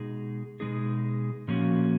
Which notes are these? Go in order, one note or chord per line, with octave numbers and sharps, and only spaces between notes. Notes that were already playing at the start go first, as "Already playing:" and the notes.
Already playing: B2 G#3 D#4 G#4
B2 G#3 D#4 G#4
A#2 F3 A#3 C#4 F#4